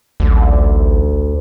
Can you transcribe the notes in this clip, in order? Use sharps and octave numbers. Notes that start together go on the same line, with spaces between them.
A1 D2